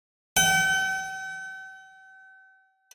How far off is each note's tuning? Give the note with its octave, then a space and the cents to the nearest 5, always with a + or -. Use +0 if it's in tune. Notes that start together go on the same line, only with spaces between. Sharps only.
G5 -45